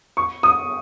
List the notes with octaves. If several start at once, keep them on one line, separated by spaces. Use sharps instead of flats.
C#6
D#6